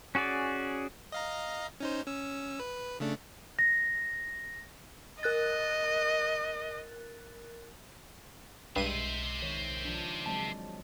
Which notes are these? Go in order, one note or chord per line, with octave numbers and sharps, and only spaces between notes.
C#4 F#4 G#4 D5
D#5 F5 A#5
C#4 D#4 C5
C#4 E6
B4
C#3 A3 D4
A#6
A#4 D#5 F#6 A6
B1 G2 G#3 C5 E5 D#7
D#3 C#5
F3 D4
F#3 G#3 C4 A5